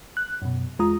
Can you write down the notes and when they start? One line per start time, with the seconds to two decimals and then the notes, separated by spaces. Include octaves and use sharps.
0.17 F#6
0.42 F#2 B2
0.79 E2 G#3 F4 A#5 D#6